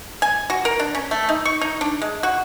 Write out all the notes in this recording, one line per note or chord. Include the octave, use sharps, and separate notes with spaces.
G#5
F#4
A#4
D4
C#4
A3
D#4
C#6
D#4
D4
G#3
F#4